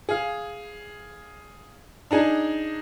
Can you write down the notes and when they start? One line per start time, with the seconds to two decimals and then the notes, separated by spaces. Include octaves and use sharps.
0.09 G#4 F5
2.11 D4 D#4 G#4